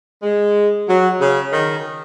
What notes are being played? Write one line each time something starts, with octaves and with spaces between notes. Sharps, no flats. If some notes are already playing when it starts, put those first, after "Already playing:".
G#3
F#3
C#3
D#3